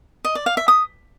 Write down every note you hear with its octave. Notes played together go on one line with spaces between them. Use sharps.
D#5
D5
F5
E5
D#6